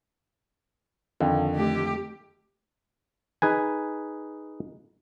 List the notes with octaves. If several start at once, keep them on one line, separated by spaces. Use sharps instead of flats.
F2 D3 D#3
A3 G4
D#4 G#4 B4 G#5